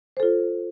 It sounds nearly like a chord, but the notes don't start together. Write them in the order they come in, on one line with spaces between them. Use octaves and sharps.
C5 A4 F4